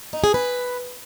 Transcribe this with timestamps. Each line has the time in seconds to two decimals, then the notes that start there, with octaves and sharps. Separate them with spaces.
0.13 D#4
0.24 G#4
0.34 B4